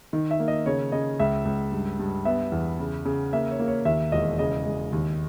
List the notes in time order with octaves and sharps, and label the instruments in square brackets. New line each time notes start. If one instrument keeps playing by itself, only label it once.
[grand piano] D#3
E5
A#3
D#5
C#3 C#5
C#3 D#5
C#2 E5
C#2
G2
G2
B3 E5
E2
C#3
C#3
A#3 E5
C#5
A#3
C#5
D#2 E5
E1 D#5
C#3 D#5
G#3
D#2